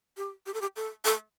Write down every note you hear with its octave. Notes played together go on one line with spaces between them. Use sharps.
G4
G4
A4
G4
A4
A4